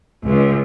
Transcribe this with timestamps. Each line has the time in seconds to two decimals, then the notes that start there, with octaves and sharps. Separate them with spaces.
0.25 C#2